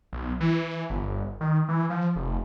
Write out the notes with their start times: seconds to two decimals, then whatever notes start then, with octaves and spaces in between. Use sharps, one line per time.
0.13 B1
0.41 E3
0.90 G1
1.41 D#3
1.69 E3
1.90 F3
2.16 F1